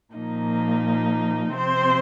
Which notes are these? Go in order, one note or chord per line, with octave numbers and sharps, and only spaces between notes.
A#2 F3 A#3 D#4
C3 F3 C4 C5